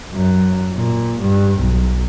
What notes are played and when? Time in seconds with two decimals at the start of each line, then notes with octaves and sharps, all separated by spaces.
0.14 F#2
0.74 A#2
1.21 G2
1.59 B1